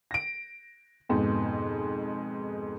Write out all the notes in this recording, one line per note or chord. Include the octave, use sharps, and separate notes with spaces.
A#6 D7
F2 G#2 B2